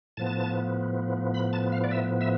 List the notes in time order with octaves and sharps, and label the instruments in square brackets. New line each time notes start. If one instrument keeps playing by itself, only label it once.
[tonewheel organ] A2 F3 B3 A5
B5
A5
F5
D5
E5
E5